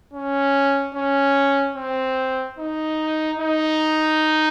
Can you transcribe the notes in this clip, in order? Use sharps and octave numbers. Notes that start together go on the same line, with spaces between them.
C#4
C#4
C4
D#4
D#4